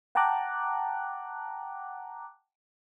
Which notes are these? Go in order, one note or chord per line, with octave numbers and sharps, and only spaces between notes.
F#5 G5 A5 A#5 D6 F#6